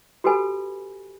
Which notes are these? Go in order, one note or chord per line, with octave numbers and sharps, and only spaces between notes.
F#4 G4 A4 B4 G#5 B5